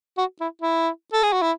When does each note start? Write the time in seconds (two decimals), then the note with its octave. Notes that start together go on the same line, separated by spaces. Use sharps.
0.18 F#4
0.41 E4
0.62 E4
1.13 A4
1.23 G#4
1.33 F#4
1.42 E4